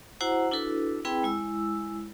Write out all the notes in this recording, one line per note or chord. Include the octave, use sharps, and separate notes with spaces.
E4 F#4 C5 F#5 A#5
D4 E4 F#4 A4 B4
C4 E4 G#4 B4 G5 B5
G#3 E4 E6